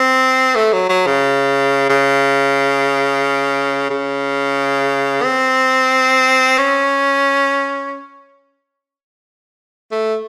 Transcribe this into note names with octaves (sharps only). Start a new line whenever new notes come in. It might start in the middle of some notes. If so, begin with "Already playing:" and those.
Already playing: C4
A3
F#3
F#3
C#3
C#3
C#3
C4
C#4
A3